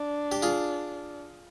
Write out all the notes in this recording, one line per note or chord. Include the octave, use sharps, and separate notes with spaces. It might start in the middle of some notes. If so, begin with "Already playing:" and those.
Already playing: D4
G4
F4 G#4